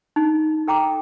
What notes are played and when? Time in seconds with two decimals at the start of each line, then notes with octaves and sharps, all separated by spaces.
0.16 D#4
0.68 A4 G5 A#5 D6